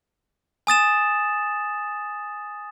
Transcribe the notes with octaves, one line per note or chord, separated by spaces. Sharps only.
G#5 D#6 A6 E7